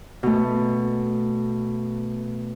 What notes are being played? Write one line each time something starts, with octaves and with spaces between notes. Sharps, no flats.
B2 A3